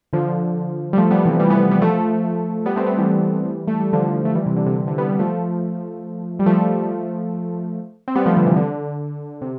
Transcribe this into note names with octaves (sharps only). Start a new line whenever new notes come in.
D3 F3
G3
F3 A3
G3 B3
C3 E3
E3 G3
G3 B3
G3 B3
F3 A3
G3 B3
A3 C4
G3 B3
E3 G3
A3
G3
D3 F3
A3
E3 G3
C3 E3
D3
C3
C3
D3
G3 B3
G3 B3
F3 A3
G3
F3 A3
C4
G3 B3
F3 A3
D3 F3
C3 E3
D3
C3